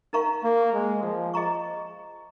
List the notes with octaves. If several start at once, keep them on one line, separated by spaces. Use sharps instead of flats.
D#4 A#4 F5 A#5 C#6
A#3
G#3
F3
G#4 D#5 A#5 C#6